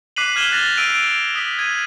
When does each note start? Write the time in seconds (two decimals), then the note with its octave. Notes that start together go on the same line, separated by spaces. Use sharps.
0.16 D6 F#6 B6 C7 D#7 F#7
0.36 F6 G#6 D#7 E7 F#7 G7
0.52 F#6 A6 A#6 F7
0.77 E6 D7 D#7 F7
1.35 D#6 B6
1.59 G#6 D#7